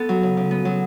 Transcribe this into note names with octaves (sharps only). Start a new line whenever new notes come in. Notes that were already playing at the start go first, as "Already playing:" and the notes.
Already playing: B3 A4
F#3
C#3
C#3
B3
F#3